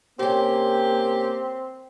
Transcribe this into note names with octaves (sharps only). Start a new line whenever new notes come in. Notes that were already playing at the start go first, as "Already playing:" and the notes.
C3 A#3 C4 C#4 G4